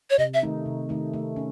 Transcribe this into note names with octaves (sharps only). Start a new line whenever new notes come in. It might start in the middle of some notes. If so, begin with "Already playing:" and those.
C#5
C3 D#5
E5
D#3 A3 D#4
C3
D#3 A3 D#4
A3
C#4